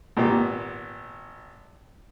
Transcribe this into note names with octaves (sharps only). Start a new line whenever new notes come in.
G#1 A#2 B3 G4